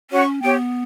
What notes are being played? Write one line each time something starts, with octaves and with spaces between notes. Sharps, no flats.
C#4 F#4 C#5 F#5 C#6
B3 G4 C#5 G5